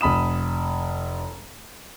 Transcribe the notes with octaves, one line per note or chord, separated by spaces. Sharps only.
F1 B5 D#6 E7